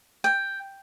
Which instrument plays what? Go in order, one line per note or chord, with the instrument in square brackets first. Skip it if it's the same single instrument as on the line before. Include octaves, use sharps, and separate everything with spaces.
[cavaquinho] G5